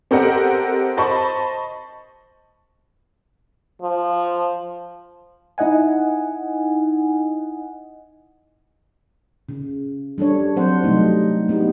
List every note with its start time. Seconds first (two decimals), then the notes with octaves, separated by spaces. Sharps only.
0.11 C4 G4 A4 A#4 D#5 F#5
0.97 C5 D#5 A5 B5 C#6
3.82 F3
5.58 D#4 E4 D#5 F#5 G#5
9.49 C#3
10.18 G3 D4 A4 C#5
10.56 F#3 C4 C5 F#5
10.83 C3 F#3 G3 A3 D#4
11.48 G#3 B3 D#4 E4 G4